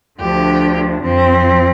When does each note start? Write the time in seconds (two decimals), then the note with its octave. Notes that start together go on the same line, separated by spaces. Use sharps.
0.20 D2 D3 F3 D4 G4
1.03 F2 F3 C4